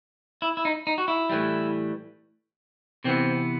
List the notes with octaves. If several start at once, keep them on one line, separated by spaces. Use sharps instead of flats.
E4
E4
D#4
D#4
F#4
E4
A2 E3 G3
C3 E3 B3 C4